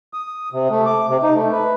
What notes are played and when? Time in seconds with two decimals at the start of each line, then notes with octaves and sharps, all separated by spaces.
0.14 D#6
0.53 C3
0.70 A3
0.86 D6
1.09 C3
1.23 D#4
1.35 A3
1.52 B4